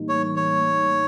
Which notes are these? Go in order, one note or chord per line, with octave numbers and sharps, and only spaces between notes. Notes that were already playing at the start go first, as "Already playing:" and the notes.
Already playing: A2 E3 G3 A#3 D#4
C#5
C#5